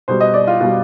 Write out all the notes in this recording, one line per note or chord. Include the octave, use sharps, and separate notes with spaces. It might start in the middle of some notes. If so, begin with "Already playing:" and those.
B2 G3 C5
D#5
D5
F4
B2 G3 F4